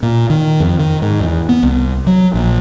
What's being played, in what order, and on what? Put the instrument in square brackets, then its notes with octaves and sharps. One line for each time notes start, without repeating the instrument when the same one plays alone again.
[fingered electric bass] A#2
D#3
F2
D#3
G#2
E2
B3
C2
F#3
A#1